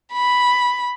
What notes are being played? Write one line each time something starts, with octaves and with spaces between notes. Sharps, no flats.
B5